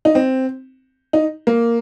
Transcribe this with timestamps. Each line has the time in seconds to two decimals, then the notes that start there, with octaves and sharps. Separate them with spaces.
0.05 D#4
0.15 C4
1.13 D#4
1.47 A#3